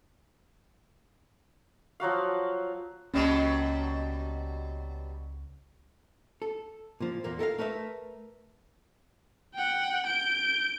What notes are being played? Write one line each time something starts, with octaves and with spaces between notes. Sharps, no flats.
F3 F#3 F#4 F5
C#2 B2 F#3 G3 A#3 C#4
A4
A#2 F3
E2 A#2 A#3
A4 A#4 E5 F5
A3 A#4 B4 E5
F#5 G5
G6 D7